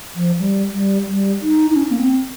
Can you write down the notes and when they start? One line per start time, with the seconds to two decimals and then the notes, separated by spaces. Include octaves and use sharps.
0.15 F3
0.39 G3
0.74 G3
1.08 G3
1.42 D#4
1.71 D#4
1.76 C#4
1.91 A#3
1.99 C4